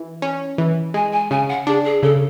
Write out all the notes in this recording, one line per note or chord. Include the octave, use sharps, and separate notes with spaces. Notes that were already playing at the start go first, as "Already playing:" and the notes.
Already playing: E3
C#4
E3
G#3 G#5
G#5
C#3 G#5
F#5
D4 G#4
G#4
C#3 A4